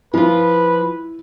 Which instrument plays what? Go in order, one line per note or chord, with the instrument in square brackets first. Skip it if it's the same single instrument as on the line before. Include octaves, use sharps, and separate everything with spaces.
[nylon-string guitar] F3 F4 [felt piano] E4 [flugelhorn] B4